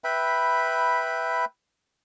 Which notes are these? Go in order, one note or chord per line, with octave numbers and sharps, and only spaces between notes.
B4 E5 G5 B5